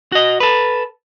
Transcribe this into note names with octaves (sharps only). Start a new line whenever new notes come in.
F#4 D#5
A4 B4